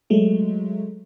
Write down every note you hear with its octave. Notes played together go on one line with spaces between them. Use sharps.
F#3 G#3 A3